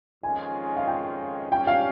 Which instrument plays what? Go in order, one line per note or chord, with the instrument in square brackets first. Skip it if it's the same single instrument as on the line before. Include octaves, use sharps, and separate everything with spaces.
[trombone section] F2 D#3 G#3 C#4 F4 [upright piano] G#5
[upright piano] F5
G5
[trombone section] G2 G3 C#4 [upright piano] G5
[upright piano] F5